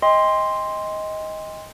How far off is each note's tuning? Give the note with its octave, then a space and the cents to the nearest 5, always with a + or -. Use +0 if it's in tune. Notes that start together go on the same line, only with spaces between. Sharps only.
D#5 +15 G5 +40 C6 +0